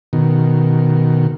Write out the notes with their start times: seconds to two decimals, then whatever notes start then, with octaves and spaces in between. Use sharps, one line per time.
0.13 B2 D#3